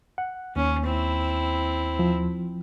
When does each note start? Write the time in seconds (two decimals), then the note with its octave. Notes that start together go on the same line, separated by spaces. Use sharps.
0.18 F#5
0.56 D#2 C#4
0.86 C4 E4
1.99 F3